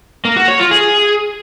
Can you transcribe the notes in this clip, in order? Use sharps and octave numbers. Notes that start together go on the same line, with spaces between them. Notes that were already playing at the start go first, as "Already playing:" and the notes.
A#3
F#4
C#5
F4
G#4